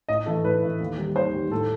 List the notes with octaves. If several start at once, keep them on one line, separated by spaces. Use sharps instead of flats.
A2 D#5
E3 A3 A4
A2 B4
E3 A3
D#2
D#3 G3
D#2 C5
D#3 G3
A2 A4